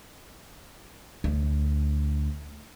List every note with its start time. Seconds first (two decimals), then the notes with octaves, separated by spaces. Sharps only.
1.24 D2